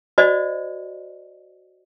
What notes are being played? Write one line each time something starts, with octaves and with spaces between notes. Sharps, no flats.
F#4 C5 D5 D#5